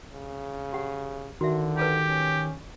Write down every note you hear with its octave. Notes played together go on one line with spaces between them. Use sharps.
C#3
G4 F#5
D3 D#3 F#4 E5
D#4 G4 A4 B4
C#4